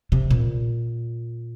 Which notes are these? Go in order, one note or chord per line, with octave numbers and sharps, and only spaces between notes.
C3
A#2